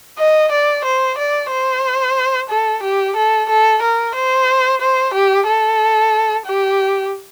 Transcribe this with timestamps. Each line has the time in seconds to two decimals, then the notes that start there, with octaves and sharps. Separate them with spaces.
0.19 D#5
0.52 D5
0.85 C5
1.18 D5
1.51 C5
2.50 A4
2.83 G4
3.16 A4
3.49 A4
3.82 A#4
4.15 C5
4.81 C5
5.14 G4
5.47 A4
6.46 G4